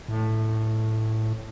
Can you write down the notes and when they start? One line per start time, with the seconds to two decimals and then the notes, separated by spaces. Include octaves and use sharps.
0.08 A2